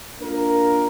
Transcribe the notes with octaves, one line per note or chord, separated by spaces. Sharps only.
A#3 D4 F4 A#4